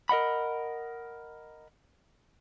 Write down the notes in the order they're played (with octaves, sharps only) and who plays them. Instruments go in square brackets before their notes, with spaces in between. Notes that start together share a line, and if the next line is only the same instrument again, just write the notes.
[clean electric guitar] A#4 D#5 F#5 B5